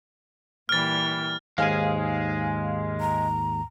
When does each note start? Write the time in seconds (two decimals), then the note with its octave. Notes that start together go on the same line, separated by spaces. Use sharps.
0.69 A#2 E3 G3 F6 A6
1.58 D#2 G#2 G#3 G#4 F5 G#5
3.01 A#5